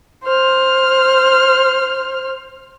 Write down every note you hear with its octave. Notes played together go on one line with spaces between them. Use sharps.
C5 F6